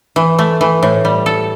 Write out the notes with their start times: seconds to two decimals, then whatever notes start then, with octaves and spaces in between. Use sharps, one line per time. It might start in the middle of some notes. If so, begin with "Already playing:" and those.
0.16 E3
0.39 A3
0.61 E3
0.83 A2
1.05 G3
1.26 A4